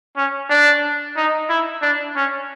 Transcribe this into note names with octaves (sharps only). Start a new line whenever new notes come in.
C#4
D4
D#4
E4
D4
C#4